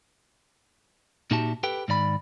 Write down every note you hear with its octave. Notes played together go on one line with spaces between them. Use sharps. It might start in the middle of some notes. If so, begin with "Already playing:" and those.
A#2 D#4 F#4 G4 E5 A5
G4 A4 B4 G5
G#2 D#3 D5 B5